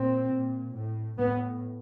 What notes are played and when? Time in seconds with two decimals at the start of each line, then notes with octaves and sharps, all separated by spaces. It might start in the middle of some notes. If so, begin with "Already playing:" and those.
Already playing: A#2 C4
0.31 A#2
0.75 A2
1.18 A2 B3